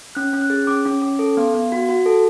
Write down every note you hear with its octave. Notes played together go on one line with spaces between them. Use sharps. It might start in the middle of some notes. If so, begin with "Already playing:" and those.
C#4 F#6
C#4
F#6
G#4
C#4 D6
C#4
C#4
A4
B3
B3
F#4
F#4
A4